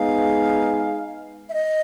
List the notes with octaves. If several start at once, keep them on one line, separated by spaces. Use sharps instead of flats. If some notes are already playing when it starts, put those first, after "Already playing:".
Already playing: G#3 B3 D#4 G#4 F5
E5
D#5